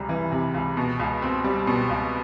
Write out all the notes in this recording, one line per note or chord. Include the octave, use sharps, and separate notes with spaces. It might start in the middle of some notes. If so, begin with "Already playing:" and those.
Already playing: C#2 C3 G3 A#5
E3
C3
C#2
B2
C#2
C4
G3
B2
C#2